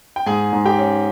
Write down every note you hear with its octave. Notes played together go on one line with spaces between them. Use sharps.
G5
G#2 G#4 G#5
G#2
G4 G5
C#4